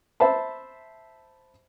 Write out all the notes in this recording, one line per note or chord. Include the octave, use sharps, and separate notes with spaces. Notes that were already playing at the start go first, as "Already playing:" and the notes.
C5 E5 A5 B5